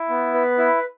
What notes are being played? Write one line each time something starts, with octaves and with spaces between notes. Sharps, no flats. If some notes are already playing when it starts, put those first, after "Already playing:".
Already playing: E4
B3
B4
E4